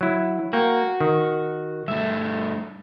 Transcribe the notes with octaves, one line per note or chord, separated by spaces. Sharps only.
F#3 E4
A#3 F#4 G5
D#3
G2 A3 E5